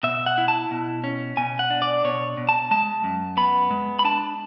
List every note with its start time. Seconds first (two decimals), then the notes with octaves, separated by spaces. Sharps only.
0.03 B2 E5
0.26 F#5
0.38 E4
0.48 A5
0.71 B2
1.04 C#4
1.37 B2 G#5
1.59 F#5
1.70 D4
1.82 D5
2.04 B2 C#5
2.37 B2
2.49 A5
2.71 G#3 A5
3.04 F#2
3.37 B3 B5
3.71 G#3
3.99 B5
4.04 D4 A5